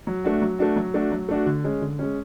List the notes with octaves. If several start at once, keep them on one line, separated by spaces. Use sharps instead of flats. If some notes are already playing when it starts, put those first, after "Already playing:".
F#3
A3 D4 F#4
F#3
A3 D4 F#4
F#3
A3 D4 F#4
F#3
A3 D4 F#4
D3
G#3 C#4
D3
G#3 C#4